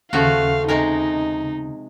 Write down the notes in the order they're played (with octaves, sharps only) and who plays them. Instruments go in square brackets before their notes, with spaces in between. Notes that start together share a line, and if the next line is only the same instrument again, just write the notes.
[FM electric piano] D#2 C#3 [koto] F3 A3 F#4 [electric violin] F5
[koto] C3 G#3 A#4 [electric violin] D#4